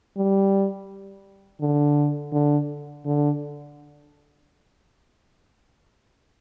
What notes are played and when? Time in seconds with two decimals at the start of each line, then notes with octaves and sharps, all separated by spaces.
0.17 G3
1.61 D3
2.33 D3
3.05 D3